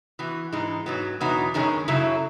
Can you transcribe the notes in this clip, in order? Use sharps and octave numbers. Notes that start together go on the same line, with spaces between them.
E3 B3 F#4
G#2 E3 G#3 D#4
G#2 F#3 B3
E2 B2 F#3 B3 D#4
F#2 D#3 G#3 C#4
F#2 C#3 F#3 A3 E4